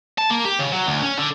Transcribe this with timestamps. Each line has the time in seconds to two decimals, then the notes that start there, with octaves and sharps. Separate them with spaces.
0.18 A5
0.30 A#3
0.45 G4
0.59 C#3
0.72 F#3
0.87 D2
1.03 C#4
1.19 D3